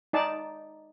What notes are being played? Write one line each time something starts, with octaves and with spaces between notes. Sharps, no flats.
D#4 D5 A5